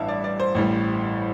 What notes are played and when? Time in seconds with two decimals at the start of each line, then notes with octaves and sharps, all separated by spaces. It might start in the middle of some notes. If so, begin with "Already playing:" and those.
Already playing: A1 G2 E3 G3 E5 F5 A5
0.08 D5
0.24 D5
0.40 C5
0.55 A1 A2 G3